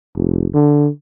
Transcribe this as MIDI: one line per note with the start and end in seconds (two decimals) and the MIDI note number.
0.15 0.47 29
0.54 0.88 50